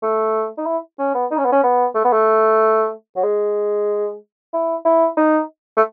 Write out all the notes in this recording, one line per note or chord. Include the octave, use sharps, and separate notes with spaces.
A3
D#4
E4
C#4
B3
D#4
C#4
B3
C#4
B3
A3
B3
A3
F#3
G#3
E4
E4
D#4
A3